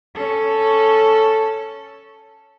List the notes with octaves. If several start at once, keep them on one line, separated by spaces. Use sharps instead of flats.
C#4 A4